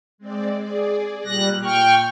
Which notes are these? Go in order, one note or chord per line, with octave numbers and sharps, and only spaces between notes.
G#3 C4 D5
G#4 D5
A#2 G3 F#6 A#6
G5 C#6 F6